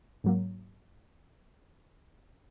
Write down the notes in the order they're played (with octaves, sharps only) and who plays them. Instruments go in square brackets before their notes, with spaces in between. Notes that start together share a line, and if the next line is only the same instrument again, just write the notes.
[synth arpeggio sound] G#2 F#3 A#3